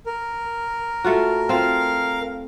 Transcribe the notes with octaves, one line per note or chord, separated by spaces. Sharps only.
A#4
A3 F4 F#4
C4 F4 F5